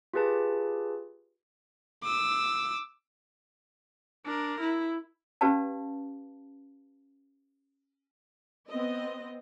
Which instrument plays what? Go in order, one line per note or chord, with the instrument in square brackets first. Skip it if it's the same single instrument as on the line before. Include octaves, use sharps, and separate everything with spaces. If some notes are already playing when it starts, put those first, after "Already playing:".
[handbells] F4 G4 G#4 B4 A5
[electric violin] D6 E6
D4 A#4
E4
[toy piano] C#4 G4 B4 D5 F5 A5
[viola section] B3 C4 D#5